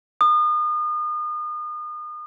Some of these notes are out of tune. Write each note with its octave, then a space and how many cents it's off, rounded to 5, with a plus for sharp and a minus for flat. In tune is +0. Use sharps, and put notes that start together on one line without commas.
D#6 -35